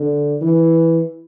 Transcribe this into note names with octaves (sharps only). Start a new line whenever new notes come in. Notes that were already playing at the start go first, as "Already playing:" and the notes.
Already playing: D3
E3